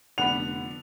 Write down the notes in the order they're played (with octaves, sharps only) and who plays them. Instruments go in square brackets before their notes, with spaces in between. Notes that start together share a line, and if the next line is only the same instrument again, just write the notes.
[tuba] F1 [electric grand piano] D3 B3 D4 [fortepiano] F#5 B5 [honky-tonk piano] F7